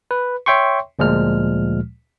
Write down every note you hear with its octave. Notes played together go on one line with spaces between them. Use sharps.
B4
C#5 E5 G5 C6 C#6
D2 A#2 F3 G#3 F6